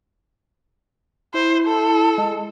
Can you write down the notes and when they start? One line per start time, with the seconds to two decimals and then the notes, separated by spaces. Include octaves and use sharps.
1.34 E4 C5
1.67 A4
2.18 G#3